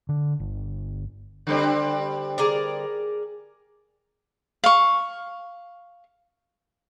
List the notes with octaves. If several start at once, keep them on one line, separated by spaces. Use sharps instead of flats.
D3
G1
D3 G3 C4
G#4 A#4 D5
F5 C#6